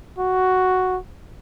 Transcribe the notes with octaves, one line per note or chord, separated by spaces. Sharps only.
F#4